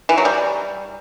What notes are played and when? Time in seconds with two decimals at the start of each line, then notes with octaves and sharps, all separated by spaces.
0.09 E3
0.18 F#3
0.25 G3